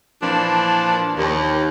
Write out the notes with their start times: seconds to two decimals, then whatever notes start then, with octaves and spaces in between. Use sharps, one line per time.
0.22 A#2 E3 F3 D4
1.17 D#2